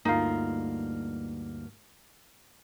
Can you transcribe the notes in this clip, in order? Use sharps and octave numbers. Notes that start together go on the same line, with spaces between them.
D2 G2 A#3 D#4 F4